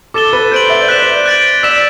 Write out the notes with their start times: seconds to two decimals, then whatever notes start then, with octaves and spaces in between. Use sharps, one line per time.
0.14 A4 D6 A6 E7 G7
0.33 B4
0.52 C5 G6 D7 F#7
0.69 E5
0.81 D5
0.89 C5 F#6 B6 E7 G7
1.02 D5
1.26 F#6 A6 D7 F#7
1.63 D5 E6 B6 E7